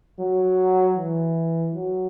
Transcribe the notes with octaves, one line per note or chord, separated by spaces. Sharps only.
F#3
E3
F#3